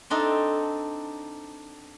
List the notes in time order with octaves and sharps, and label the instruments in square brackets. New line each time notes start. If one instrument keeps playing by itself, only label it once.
[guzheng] C4 D4 D#4 A4